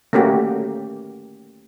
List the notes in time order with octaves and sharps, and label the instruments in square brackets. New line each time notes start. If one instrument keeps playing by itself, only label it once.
[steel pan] A3 A#3 C#4 F#4 G4